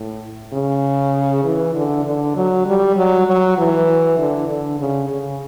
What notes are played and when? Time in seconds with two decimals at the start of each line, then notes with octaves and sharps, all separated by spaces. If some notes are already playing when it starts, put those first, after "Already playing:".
Already playing: A2
0.53 C#3
1.44 E3
1.75 D3
2.05 D3
2.36 F#3
2.66 G3
2.97 F#3
3.27 F#3
3.58 E3
4.18 D3
4.49 D3
4.80 C#3
5.10 C#3